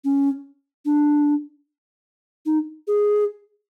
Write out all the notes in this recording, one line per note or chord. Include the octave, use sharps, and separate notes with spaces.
C#4
D4
D#4
G#4